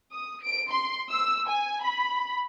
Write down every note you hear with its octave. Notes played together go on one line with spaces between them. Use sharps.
D#6
D7
C6
E6
G#5
B5